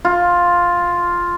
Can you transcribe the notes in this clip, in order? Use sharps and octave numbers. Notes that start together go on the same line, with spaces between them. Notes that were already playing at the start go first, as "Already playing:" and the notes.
F4